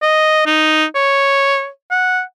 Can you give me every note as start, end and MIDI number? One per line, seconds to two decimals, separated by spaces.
0.02 0.46 75
0.46 0.85 63
0.95 1.68 73
1.91 2.22 78